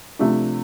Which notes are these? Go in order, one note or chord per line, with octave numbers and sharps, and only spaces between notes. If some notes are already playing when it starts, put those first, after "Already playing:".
C3 F3 A3 D4